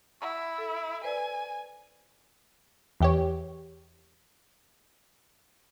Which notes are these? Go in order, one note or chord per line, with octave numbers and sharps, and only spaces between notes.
E4 F#5 B5 C#6
A4
B4 C5 D5 G#5
E2 G4 C#5